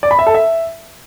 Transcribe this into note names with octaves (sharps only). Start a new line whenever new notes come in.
D5
B5
E5
A4
E5